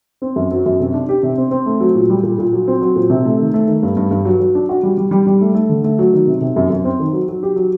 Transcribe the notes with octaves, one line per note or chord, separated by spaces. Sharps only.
C4
F#2
F#3
F#2
C3
D4
G4
C3
C4
C4
A3
F#3
A#2
G3
A#2
A#2
F#3
C4
F#3
A#2
C3
A3
D#3
A3
D#3
G2
G2
G2
F#3
F#3
D4
F#4
G3
G3
G3
G3
A3
A3
D3
A3
F#3
D#3
C3
C3
F#2
F#2
C4
D#3
F#3
F#3
G4
F#3